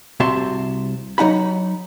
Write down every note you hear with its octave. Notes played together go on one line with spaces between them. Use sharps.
C2 C3 F#4 E5 A5 C6
F#3 D#4 F#5 B5